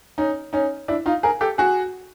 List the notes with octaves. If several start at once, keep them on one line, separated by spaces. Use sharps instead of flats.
C#4 D#4
C#4 D#4
D4 E4
D#4 F4
G#4 A#4
G4 A4
F#4 G#4